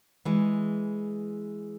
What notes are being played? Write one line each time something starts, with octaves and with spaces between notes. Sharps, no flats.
E3 G#3